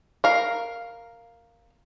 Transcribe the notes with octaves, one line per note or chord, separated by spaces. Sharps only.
A#4 F5